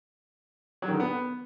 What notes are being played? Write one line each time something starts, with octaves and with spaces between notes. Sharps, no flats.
F#3
D#3
D3
B3